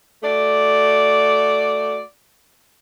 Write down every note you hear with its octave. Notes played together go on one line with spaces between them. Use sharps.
A3 F#4 D5